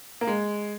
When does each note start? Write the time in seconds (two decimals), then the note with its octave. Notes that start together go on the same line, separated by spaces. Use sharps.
0.21 A#3
0.27 G#3